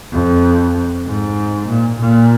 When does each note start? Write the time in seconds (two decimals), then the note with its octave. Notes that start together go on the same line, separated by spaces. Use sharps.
0.12 F2
1.06 G#2
1.68 A#2
1.99 A#2